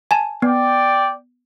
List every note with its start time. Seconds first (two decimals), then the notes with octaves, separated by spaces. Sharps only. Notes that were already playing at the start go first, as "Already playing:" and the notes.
0.11 G#5 A5
0.42 B3 D5 G5